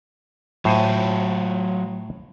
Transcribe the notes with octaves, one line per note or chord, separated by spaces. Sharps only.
A2 F#3 F4 C5 G#5